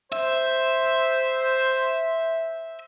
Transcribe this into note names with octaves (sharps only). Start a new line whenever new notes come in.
C5 E5